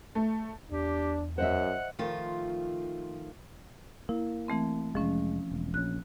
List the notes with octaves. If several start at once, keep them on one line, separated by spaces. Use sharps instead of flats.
A3
E2 D4 G4
F#2 C5 D#5 E5 F#5
D#3 F3 A3 F4
A#3 E4
E3 A3 C4
F1 C#2 F3 G#3 C#4
E1
A#1 C#4 F#6